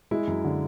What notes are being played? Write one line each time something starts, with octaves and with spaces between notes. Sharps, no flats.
G#3 E4
F#2
D3